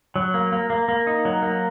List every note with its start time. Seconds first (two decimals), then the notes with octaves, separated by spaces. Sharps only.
0.16 F#3
0.34 A#3
0.53 A#3
0.70 A#3
0.88 A#3
1.07 D#4
1.25 F#3
1.42 A#3